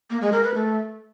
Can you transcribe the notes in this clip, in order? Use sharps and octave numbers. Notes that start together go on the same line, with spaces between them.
A#3
G#3
A#4
B4
A3